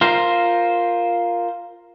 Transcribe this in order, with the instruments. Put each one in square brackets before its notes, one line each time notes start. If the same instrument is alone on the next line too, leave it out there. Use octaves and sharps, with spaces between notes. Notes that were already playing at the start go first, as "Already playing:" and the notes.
[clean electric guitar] F4 A#4 C5